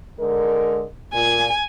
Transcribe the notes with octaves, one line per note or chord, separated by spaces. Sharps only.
D3 G#3 A#4
A#2 G#5